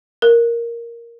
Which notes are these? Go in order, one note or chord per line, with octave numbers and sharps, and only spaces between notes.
A#4